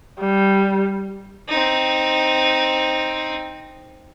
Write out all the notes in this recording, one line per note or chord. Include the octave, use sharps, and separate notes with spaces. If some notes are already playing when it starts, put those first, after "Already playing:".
G3
C4 D#4